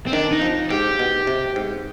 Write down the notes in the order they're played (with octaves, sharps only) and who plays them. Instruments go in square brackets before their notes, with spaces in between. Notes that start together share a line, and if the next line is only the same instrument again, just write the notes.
[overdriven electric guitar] C4
[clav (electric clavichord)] D#3 [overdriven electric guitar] D4
[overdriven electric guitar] D#4
[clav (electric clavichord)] F3
[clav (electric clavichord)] G#2 [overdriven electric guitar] G4
[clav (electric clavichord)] B2
C3
G#2